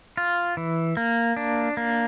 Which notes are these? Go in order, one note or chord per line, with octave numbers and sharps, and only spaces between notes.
F4
E3
A#3
D4
A#3